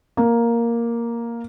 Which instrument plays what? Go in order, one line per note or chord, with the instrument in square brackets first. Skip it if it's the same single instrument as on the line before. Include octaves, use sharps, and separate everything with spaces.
[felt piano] A#3